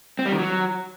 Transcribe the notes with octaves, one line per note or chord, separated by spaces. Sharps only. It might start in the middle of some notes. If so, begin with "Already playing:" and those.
C4
G3
D#3
F#3